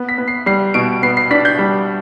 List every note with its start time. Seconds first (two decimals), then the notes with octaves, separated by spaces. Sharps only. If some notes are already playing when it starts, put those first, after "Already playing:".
Already playing: B3
0.09 B6
0.18 B3
0.28 C7
0.46 G3 C7
0.74 B2 D7
1.02 B3 C7
1.17 C7
1.31 D4 B6
1.45 G6
1.59 G3